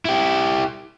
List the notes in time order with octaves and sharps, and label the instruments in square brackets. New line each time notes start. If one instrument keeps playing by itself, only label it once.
[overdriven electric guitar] E4 G4